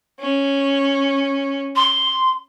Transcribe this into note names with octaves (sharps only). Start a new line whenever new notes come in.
C#4
C6